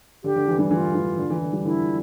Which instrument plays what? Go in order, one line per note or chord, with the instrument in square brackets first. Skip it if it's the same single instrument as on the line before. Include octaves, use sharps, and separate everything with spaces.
[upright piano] D3 [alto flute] G4
[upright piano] D3
E3
E3 G3
[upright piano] E3 [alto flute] F4
[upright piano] E3
D3
E3
D3
E3 G3
[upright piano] D3 F3 [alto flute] E4
[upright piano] F3